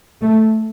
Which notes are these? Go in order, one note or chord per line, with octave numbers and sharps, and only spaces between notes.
A3